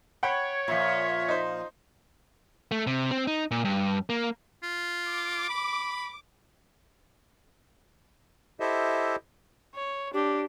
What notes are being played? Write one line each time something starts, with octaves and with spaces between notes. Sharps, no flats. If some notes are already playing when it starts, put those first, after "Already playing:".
C#5 F#5 G5 B5
A#2 F3 E5
D#4 C5
A3
C3
C4
D#4
A#2
G2
A#3
F4
D6
B5
E4 G4 A4 C5 D#5 E5
C#5
D4 G4